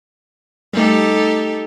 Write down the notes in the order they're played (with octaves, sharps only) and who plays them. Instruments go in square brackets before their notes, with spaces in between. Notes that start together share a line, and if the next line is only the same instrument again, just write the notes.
[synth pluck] G3 A3 [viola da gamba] D#4 G4 A4